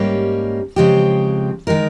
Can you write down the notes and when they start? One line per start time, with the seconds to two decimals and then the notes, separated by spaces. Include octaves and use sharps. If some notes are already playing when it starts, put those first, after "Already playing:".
Already playing: G#2 G3 A#3 C#4 G4
0.76 C#3 F3 G#3 C4 G4
1.67 D#3 G#3 D#4 A#4